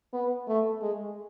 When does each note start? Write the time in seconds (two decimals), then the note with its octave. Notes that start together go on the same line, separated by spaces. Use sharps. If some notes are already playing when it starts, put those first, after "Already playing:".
0.13 B3
0.47 A3
0.82 G#3